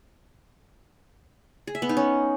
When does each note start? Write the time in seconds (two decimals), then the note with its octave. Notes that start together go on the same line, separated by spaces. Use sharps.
1.67 G#4
1.75 E5
1.82 B3
1.89 D#4
1.97 C#4